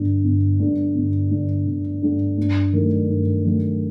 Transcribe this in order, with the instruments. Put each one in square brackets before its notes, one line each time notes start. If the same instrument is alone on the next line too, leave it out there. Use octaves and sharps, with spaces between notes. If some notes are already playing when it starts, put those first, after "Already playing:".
Already playing: [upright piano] G1 G2 D3
G1
G2 D3
G1
G2 D3
G1
G2 D3
G2
D#3 F#3 A3
G2
D#3 F#3 A3